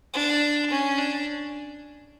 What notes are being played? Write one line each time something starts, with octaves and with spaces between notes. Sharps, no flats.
D4
C#4
D4